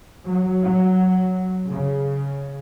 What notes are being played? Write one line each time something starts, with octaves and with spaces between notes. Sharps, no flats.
F#3
F#3
C#3